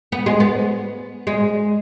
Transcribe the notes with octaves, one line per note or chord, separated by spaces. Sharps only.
B3
G#3
B3
G#3